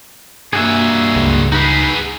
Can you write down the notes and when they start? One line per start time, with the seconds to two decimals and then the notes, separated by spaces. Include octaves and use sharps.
0.53 G2 A#3 F#4 G#4 E5
1.16 C#2
1.52 D#4 F#4 G#4 B4